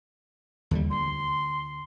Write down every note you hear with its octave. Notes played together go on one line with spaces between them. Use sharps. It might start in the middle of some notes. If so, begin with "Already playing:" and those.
D#2 D3 G3
D2 C6